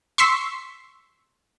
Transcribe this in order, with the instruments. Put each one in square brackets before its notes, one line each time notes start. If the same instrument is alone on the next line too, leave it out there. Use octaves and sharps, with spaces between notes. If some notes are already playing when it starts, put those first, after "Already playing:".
[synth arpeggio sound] C6 C#6 E6 B6